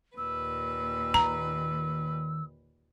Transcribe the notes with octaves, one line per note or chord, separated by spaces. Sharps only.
D#2 A#2 B4 E6
D#3 A#5